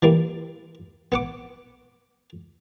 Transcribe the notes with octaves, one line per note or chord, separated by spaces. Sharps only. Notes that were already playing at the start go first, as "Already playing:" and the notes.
E3 G3 A#3
B3 F#5 D6